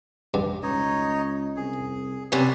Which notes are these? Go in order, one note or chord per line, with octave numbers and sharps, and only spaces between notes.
G2
C#2 D#4 C#5 D#5
C2 G#4
F#2 C3 B4 C#5 D5